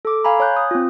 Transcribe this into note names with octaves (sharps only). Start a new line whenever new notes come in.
A4 D6
F5 G#5 A#5 B5
C#5 G#5 F#6 G6
D#6
C4 F4